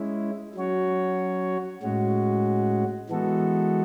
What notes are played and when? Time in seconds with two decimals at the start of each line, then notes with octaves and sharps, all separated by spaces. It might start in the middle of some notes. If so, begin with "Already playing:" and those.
Already playing: G#3 C#4 E4
0.55 F#3 C#4 F#4 C#5
1.82 A2 G#3 C#4 F#4
3.10 E3 G#3 B3 F#4 A4